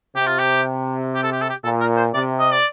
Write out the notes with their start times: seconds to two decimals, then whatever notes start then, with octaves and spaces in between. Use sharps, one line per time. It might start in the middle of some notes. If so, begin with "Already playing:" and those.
0.16 C3 G4
0.27 F4
0.39 G4
1.15 G4
1.23 A4
1.32 G4
1.41 A4
1.50 G4
1.64 A#2 A4
1.80 A#4
1.97 C5
2.13 C3 D5
2.39 D#5
2.52 D5